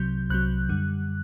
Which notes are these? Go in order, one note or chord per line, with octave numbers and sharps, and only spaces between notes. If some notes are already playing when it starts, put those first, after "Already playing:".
Already playing: C2 C3 F#3 G6
C2 C3 F#3 F#6
F#2 D3 G3